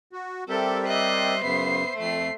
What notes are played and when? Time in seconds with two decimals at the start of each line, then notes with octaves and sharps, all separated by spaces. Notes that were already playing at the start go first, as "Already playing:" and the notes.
0.13 F#4
0.49 G3 C4 G4 A4 A#4 D5 E5
0.87 C5 D#5 F#6
1.43 F#2 C#3 B3 E5 C7
1.97 F2 A3 C7